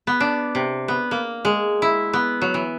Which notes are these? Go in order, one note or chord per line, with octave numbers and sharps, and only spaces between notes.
B3
D4
C3
B3
A#3
G#3
E4
B3
F#3
E3